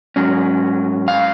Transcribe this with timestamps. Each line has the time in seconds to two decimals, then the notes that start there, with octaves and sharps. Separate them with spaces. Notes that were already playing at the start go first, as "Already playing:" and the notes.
0.16 G#2 F#3 C#4
1.08 F5